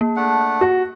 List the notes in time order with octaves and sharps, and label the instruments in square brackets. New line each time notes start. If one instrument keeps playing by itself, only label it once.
[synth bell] A#3
[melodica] A3 D4 F#5
[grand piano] F#4